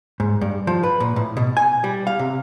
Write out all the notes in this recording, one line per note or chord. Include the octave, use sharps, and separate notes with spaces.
G#2
G2
F3
B4
A#2
A2
B2
G#5
G3
F5
C3